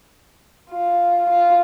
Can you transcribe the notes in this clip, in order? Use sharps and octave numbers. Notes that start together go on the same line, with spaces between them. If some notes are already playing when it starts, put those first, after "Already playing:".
F4
F4